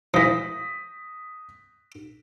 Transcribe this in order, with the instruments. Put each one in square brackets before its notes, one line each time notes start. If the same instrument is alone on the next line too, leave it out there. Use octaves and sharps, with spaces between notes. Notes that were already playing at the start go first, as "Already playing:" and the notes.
[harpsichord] E3 F3 [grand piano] D#6 A#6 B6